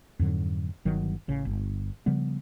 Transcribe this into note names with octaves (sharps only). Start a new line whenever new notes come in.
F2 G#2 D3 F#3
G1 D#3 F#3
A1 C#3
G1
C#3 F3 G3 B3